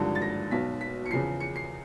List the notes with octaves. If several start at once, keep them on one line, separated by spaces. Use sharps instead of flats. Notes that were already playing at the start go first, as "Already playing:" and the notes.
Already playing: G#1 G2 D3 F3
A6
A#6
B1 B2 B6
B6
C#7
E2 C#3 F3 C7
C#7
C7